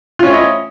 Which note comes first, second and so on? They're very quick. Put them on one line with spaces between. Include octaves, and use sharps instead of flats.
F4 C#4 C#5 E4 D#5